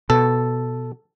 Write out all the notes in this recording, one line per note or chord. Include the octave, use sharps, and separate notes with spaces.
B2 A4